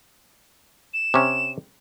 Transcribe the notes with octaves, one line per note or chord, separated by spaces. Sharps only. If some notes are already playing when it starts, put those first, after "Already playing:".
E7
C3 C#4